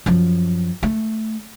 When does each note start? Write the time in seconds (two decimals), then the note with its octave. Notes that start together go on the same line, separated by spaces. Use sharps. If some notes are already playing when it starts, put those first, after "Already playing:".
0.06 F#2 F3
0.83 A3